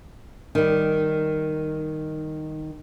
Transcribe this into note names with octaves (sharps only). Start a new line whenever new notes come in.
D#3 G3